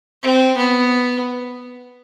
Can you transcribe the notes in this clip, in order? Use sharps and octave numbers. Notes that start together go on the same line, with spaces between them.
C4
B3